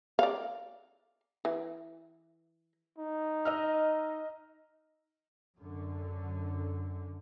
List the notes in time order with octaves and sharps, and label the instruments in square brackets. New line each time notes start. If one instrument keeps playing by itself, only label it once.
[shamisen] D5 F5
E3
[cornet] D#4
[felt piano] D#5 E6 F6
[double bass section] F#2 D3